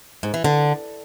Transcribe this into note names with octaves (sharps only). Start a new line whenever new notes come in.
G#2
E3
D3